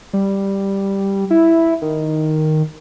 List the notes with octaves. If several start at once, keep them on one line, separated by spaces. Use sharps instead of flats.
G3
E4
D#3